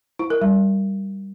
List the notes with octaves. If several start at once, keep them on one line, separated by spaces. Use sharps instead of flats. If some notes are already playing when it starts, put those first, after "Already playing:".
E4
A#4
G3